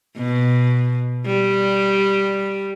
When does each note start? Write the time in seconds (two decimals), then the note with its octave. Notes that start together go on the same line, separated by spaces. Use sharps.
0.17 B2
1.26 G3